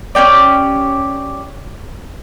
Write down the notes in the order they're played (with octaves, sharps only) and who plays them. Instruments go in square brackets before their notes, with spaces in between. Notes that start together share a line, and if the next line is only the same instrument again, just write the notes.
[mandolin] C#4 D#4 G4 D5